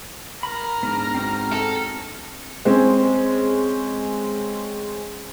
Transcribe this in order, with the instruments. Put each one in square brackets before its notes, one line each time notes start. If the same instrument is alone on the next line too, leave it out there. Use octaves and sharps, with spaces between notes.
[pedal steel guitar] A#4 B5 [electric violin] A#5 F6
[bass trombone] G#2 [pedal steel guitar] B3 D4
[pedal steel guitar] C4 D4 F#4
[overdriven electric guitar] A4
[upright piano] G#3 C4 C#4